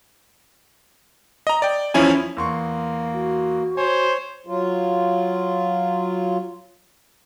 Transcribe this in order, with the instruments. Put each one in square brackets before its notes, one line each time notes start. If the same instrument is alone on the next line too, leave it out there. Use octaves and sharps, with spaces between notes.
[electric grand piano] D#5 A#5
D5 G5
E2 F3 C#4 E4 G#5
[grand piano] E2 C6 C#6 [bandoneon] A#3
[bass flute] F#4
[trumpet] C5 [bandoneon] C#5 [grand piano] G#5
[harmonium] F#3 F4